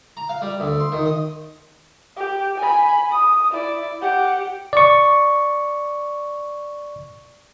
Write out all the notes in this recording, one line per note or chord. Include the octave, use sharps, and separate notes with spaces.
A#5
F5
G3
D2
C6
D#3
D#5
G4
G#5 B5
D#6
E4 D5
G4 F#5
D5 C#6